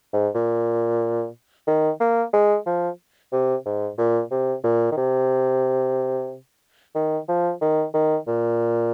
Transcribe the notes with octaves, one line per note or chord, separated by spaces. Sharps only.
G#2
A#2
D#3
A#3
G#3
F3
C3
G#2
A#2
C3
A#2
D#3
C3
D#3
F3
D#3
D#3
A#2